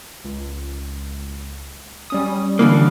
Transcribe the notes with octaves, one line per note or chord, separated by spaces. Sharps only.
C#2
G3 C#4 D#6
D3 E3 A#3